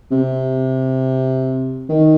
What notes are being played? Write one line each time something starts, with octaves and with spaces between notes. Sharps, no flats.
C3
D#3